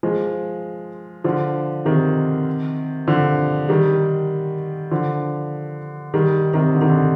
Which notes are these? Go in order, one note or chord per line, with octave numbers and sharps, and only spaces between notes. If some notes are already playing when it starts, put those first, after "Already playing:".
F3 G#3
D3 F3
C3 D#3
D3 F3
D#3 G3
D3 F3
D#3 G3
C3 D#3
D3
D#3
D3